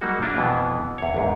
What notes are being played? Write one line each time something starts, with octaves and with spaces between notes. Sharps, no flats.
F#3 G3 A#3 D#4 F#4 G#4
A#3 D4 E4 F4
F2 B2 E3 B3
E2 C#5
A#1 E2 G#2